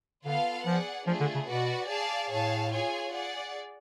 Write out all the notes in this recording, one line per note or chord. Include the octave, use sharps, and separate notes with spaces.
D3 B3 F4 A4 F5
F3 G#4 D5 F#5
F3 A3 D4 F4 G#4
D3
C#3
B2 F#4 B4 D5 F#5
G#4 D5 F5 A5
A2 G#4 C#5 F5 A5
F4 G#4 C#5 G#5
G#4 D5 F#5